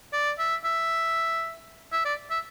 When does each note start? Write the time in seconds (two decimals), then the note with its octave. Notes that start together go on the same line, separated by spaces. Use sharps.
0.13 D5
0.38 E5
0.64 E5
1.92 E5
2.05 D5
2.30 E5